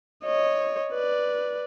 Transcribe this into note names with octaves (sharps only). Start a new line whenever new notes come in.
C#5 D#5
B4 D5